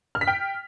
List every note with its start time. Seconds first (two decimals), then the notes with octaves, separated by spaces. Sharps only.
0.15 F6
0.21 B6
0.28 G5